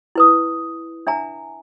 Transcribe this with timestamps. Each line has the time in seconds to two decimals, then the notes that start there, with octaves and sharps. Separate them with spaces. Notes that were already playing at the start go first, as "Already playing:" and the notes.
0.15 E4 B4 D#6
1.07 D4 E5 G#5 A#5